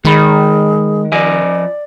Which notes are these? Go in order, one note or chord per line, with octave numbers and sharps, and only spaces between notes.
D#3 G#3 G#4 B5
F3 D5 D#5 G#5